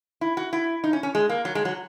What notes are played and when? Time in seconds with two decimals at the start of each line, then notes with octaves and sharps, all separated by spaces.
0.21 E4
0.37 F#4
0.53 E4
0.84 D#4
0.93 C#4
1.03 C#4
1.15 G#3
1.29 A#3
1.45 F#3
1.55 G#3
1.65 F#3